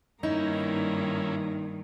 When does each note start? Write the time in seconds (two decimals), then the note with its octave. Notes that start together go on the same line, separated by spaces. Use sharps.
0.23 G2 D#3 A#3 C#4 D#4 E4 A#5